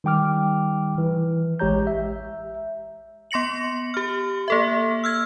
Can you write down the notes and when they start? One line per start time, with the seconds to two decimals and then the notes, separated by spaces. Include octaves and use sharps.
0.04 D#3 G3 G5 D6 F6
0.98 E3
1.59 A1 G#3 G4 C#5 A#5 G6
1.87 E5
3.31 B3 C6 A#6 C#7 F#7
3.94 G4 F6
4.48 A#3 A4 E5
5.04 E6 F6 G#6